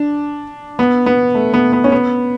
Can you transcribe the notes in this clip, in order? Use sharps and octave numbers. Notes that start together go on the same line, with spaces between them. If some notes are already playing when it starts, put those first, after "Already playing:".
Already playing: D4
B3
B3
A3
B3
B3
C#4
B3